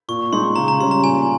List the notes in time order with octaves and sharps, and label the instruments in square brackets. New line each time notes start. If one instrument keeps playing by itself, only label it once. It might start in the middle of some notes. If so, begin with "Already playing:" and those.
[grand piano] A#2 [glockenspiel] C#6
[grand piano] G#3 D#4 G#4 [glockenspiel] C6
[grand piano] C#3 [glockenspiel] A#5
[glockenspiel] A#5
[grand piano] G3 C#4 [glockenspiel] C6
[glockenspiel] A#5
[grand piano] A#2 [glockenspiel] G#5